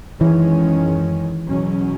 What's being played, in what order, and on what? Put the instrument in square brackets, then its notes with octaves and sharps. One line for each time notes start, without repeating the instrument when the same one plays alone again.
[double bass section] F#2 D#3 G#3 C#4 [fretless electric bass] E3
[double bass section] E2 B2 F#3 C#4